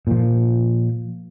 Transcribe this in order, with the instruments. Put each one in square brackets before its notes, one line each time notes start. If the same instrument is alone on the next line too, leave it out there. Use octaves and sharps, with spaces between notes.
[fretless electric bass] A#2 F3